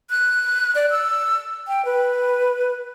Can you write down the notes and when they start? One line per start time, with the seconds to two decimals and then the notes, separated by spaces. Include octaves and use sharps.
0.10 F#6
0.75 D5
0.91 E6
1.68 G5
1.85 B4